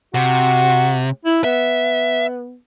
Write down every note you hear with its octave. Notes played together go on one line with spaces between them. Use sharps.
C3 F#4
E4
B3 E5